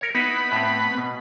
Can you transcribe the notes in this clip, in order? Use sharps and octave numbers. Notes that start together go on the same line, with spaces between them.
A#4 C#5
B3 D#4 E4 B5
A2 C4
B2